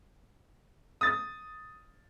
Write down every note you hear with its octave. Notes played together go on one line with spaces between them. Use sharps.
D#6 A6